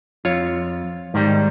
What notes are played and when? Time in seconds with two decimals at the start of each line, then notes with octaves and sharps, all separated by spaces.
0.25 F2 F4 C#5
1.14 G#2 D#3 G3